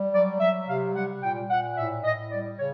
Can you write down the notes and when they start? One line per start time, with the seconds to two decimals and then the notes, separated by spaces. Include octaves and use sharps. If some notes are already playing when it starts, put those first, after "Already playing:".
Already playing: G3
0.12 F#3 D5
0.40 F#3 E5
0.67 C3 F5
0.94 G3 F#5
1.21 A#2 G5
1.49 A#2 F#5
1.76 A2 E5
2.03 A2 D#5
2.30 G3 D5
2.57 C#3 C#5